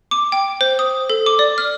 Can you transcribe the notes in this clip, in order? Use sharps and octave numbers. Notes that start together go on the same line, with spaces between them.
D6
G5
C5
D#6
A4
D6
D5
F6